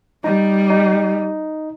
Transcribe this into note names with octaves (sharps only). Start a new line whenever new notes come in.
G3 D#4
D#4